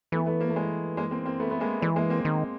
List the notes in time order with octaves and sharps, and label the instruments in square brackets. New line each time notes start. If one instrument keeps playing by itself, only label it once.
[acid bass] E3 [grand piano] A3 B3
[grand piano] A3 B3
A#3
A3
G#3 A#3
G#3 A#3
A#3 C4
A#3 C4
A3 B3
A3 B3
G#3 A#3
[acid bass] E3 [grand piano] G#3
[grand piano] G#3 A#3
A#3 C4
[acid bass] D#3